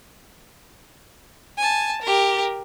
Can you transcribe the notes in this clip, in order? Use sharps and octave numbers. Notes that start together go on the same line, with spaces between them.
G#5 A5
G4 A#4